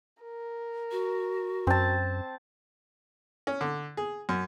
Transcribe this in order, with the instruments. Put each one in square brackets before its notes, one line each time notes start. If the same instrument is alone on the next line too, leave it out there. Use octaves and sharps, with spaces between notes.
[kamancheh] A#4
[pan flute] F#4
[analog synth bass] F#2 [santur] C4 A5
[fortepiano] C#4
D3
G#4
F#2